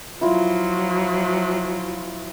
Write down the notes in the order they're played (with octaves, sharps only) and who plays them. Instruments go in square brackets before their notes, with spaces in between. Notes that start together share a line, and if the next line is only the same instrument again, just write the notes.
[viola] F3 F#3 [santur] E4 F4 A#5